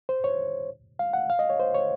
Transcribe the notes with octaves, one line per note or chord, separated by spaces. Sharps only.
C5
C#5
F5
F#5
F5
D#5
C#5
C5
C#5